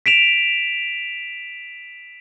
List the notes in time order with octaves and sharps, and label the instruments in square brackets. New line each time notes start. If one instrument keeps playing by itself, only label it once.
[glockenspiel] B6 D7 E7 F7